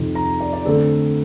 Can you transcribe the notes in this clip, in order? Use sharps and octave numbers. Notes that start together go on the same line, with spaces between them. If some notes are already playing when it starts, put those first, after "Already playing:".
Already playing: F2 C3 D#3
A#5
D5
D5
D3 A3 C4 A4